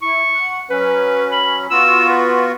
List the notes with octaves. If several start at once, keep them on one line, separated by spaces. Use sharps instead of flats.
E4 C#6
F#5
F#3 C#4 B4
B5
B3 F4 F#4 E6
B4